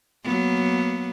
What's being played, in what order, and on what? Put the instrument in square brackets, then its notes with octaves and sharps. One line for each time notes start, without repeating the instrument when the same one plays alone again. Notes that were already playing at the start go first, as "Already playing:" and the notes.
[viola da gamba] F#3 A#3 B3